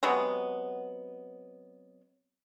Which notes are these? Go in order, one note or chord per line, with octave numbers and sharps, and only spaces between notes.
C3 F#3 G#3 B3